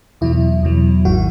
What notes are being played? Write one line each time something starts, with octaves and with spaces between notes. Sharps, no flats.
E2 B2 F#3 E4
E2 B2 F#3
G#1 G#2 D#3 F#4